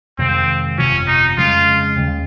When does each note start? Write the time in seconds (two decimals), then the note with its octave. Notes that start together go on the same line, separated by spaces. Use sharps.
0.18 F2 C3 D#3 G#3 C4
0.78 G1 F2 C3 F3 C#4
1.07 D#4
1.37 F2 C#3 G#3 F4
1.96 D#2 C#3 G#3